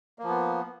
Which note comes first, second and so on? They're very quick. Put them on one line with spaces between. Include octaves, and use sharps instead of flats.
A#3 F3 B3